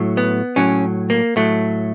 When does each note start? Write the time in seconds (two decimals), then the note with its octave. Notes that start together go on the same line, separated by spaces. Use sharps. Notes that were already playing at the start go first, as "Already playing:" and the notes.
Already playing: A2 F#3
0.17 B3
0.56 A2 F#3 C#4
1.10 A#3
1.36 A2 F#3 A3